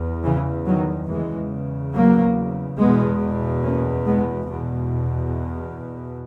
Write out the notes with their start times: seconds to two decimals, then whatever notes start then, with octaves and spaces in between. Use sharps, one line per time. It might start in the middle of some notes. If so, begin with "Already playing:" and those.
Already playing: E2
0.23 C#3 E3
0.66 D#3 F#3
1.08 E2 C#3 E3 G#3
1.93 F#3 A#3
2.78 E2 B2 G#3 B3
3.63 A#3 C#4
4.06 G#3 B3
4.48 E2 B2